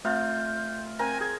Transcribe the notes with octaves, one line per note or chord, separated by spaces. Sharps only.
A3 C4 F4 E5 F6 G6
C4 A#4 G#5 A#5
G#4 G#6